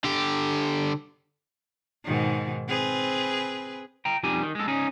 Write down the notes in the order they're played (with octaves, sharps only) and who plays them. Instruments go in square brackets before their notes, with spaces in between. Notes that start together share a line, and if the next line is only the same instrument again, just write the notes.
[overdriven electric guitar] D3 G4
[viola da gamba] G#2 B2 D#3
C4 G#4 B4
[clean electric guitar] G5 A#5
F2 G3 D#4 G4 G#5
D#3
G#3 A4
C#4 D#4 G#4